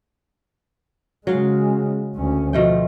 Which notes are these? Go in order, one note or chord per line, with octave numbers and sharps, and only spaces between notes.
C#3 F#3 G#3 F5
D2 C#4
B2 F3 A3 G5